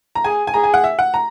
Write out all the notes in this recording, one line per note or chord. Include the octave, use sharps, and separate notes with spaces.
A#5
G#4 G#5
G#5
G#4 A#5
G#5
F#5
E5
F#5
A#5